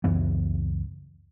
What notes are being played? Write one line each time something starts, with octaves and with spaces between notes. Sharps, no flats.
C#2 F#2 E3 B3